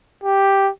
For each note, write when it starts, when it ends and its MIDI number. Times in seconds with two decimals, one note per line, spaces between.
0.24 0.70 67